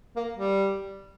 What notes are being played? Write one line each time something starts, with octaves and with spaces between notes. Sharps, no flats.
A#3
G3